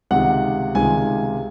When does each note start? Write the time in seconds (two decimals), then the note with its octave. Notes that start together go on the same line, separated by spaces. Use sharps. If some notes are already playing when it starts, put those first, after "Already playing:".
0.11 C#2 C3 D#3 F#5
0.75 C#2 C3 D#3 G#5